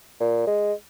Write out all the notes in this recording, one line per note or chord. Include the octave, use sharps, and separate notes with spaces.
A#2
G#3